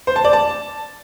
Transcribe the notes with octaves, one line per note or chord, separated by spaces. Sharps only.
C5
A5
D5
A5